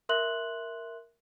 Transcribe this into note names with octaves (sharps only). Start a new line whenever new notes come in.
A#4 E5 C6 F#6 F#7